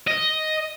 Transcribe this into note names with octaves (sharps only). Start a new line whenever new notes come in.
D#5